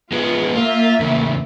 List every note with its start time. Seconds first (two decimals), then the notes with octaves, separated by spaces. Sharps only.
0.12 G#3 B3 F4 G#4
0.56 A#3 F4 E5
1.00 E2 C#3